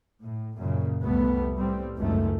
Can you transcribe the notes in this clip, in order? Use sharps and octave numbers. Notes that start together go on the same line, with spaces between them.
A2
F#2 A#2 C#3
C2 F2 G3 A3 B3
A2 G3 C4
G#1 C#2 F#2 D#3 A3